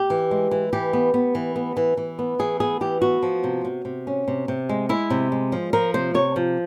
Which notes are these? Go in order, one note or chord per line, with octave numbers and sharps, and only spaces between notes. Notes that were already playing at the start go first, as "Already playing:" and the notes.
Already playing: G4
E3
G#3
E3
E3 G4
B3
B3
E3
B3
E3
E3
B3
E3 G#4
B3 G#4
E3 G4
B3 F#4
F3
C3
C3
C3
C#4
C3
C3
G#3
G#3 E4
C3
G#3
F3
F3 A#4
C3 C5
C3 C#5
F3